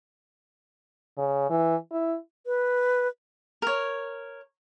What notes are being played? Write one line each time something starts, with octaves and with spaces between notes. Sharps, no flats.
C#3
E3
E4
B4
A#4 C#5